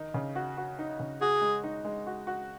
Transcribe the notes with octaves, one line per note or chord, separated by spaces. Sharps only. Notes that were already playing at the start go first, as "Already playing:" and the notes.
Already playing: D#3 D#4
C#3
F#4
F#4
D#4
C#3
F#4 G#4
G#3
D#4
G#3
F#4
F#4